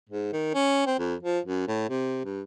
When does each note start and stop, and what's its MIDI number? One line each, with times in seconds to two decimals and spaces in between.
0.09 0.30 44
0.33 0.54 51
0.54 0.84 61
0.86 0.94 60
0.99 1.15 41
1.23 1.39 53
1.45 1.65 42
1.68 1.87 45
1.89 2.23 48
2.25 2.42 43